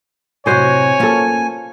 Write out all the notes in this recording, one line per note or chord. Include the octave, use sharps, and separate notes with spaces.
F#2 A2 C3 F#4 C5 C#5 D#5 G#5
A#3 C#4 F4 A4